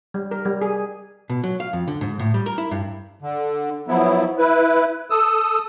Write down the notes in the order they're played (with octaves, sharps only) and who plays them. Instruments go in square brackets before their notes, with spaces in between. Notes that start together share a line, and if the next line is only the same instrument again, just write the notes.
[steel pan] G3
A#4
G3
G#4
[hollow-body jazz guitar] B2
F#3
F5
F2
D3
G#2
A2
G3
A#4
E4
G2
[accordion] D3
F3 F#3 B3 E4
E4 B4
A4 D#6 E6